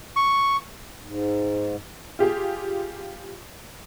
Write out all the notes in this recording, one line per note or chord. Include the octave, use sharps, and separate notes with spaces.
C#6
G#2
F4 G4 G#4